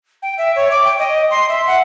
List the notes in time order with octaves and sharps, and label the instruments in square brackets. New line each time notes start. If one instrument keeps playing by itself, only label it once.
[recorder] G5
E5
C#5
D6
G5
D#5
C6
E5
F#5